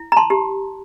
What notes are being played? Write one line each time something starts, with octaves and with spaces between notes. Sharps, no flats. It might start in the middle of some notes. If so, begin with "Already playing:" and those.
Already playing: E4
A#5
A5 C6
G4